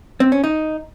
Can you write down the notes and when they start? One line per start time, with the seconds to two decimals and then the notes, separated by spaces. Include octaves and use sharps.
0.20 C4
0.32 C#4
0.44 D#4